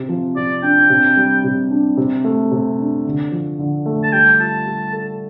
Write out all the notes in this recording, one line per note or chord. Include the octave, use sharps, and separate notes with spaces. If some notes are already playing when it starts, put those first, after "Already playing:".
Already playing: C3 C4
F3
C3 D5
D4 G5
C3
G3
C3
D4
C3
A3
C3
D4
D3
F3
D3
A3
A5
G3 G5
F4 A5
G3
A4